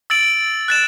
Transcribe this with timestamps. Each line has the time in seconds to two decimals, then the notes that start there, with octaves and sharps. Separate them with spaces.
0.10 E6 A6 D7 F#7
0.68 F#6 A6 E7